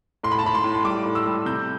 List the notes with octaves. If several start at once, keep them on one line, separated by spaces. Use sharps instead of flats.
A2 C6
B5
A5
A2 B5
C6
A2
C6
G3 D6
A2
E6
G3
C3 G6